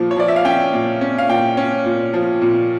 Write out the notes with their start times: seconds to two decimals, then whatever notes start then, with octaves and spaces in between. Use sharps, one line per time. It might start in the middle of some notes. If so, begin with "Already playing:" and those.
Already playing: A#2 F3
0.11 C#5
0.16 F3 D5
0.28 E5
0.36 F5
0.45 C#4 G5
0.73 A#2
1.01 C#4
1.18 F5
1.29 A#2 G5
1.57 C#4
1.86 A#2
2.14 F3
2.42 A#2